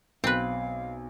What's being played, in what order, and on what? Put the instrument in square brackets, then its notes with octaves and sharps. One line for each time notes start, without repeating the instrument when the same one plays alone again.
[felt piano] B1 [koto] C4 B4 [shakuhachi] F5